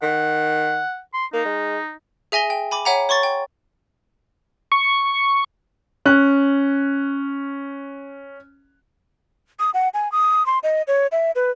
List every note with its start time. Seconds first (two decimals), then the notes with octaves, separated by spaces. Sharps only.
0.02 D#3 F#5
1.13 C6
1.33 A#3 D#4
1.45 G#3
2.32 G#4 E5 G#5 A#6 G7
2.50 G5
2.71 G#5 B5 D6
2.85 C#5 E5 F#5 G#5 A#5
3.09 C#5 C6 C#6 A6
3.23 G5
4.72 C#6
6.06 C#4 F#6
9.59 D#6
9.74 F#5
9.94 G#5
10.12 D#6
10.46 C6
10.63 D#5
10.88 C#5
11.12 E5
11.35 B4